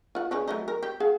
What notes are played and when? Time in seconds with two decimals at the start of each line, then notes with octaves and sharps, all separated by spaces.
0.15 F4 F#5
0.31 C#3 C#4 D4
0.48 F#3 A3 D#4
0.68 A#4
0.83 G4
1.00 G#4 F5 F#5